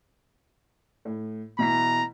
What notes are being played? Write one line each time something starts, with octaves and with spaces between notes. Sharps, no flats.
A2
B2 E3 A#5 B6